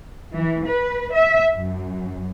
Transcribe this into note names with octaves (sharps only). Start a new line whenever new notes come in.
E3
B4
E5
F#2